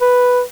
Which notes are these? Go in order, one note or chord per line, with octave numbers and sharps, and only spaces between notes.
B4